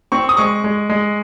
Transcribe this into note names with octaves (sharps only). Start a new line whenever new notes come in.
C4 C#6
D#6
G#3 C#6
G#3
G#3